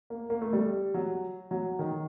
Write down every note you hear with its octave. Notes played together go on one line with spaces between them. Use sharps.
A#3
A#3
A3
G3
F#3
F#3
D#3